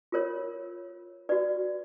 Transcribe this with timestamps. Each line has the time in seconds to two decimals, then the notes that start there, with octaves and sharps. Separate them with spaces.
0.12 F4 A#4 C#5
1.29 F#4 B4 D5